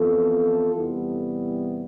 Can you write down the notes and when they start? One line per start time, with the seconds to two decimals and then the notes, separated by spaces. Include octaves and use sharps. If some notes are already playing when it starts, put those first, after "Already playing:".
Already playing: F2 E3 B3 F4 A4
0.74 E2 C3 G3 B3 E4